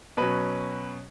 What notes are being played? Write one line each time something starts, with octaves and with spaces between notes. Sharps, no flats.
B2 F#3 C#4 B4